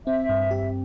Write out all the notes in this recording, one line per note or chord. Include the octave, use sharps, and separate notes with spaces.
C4 E5
G2
G4